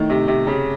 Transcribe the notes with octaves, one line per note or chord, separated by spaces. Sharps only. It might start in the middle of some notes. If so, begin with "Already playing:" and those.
Already playing: A2 D#3
C3
C3
C#3